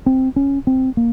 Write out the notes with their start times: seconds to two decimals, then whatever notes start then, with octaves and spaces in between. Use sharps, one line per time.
0.06 C4
0.36 C#4
0.67 C4
0.97 A#3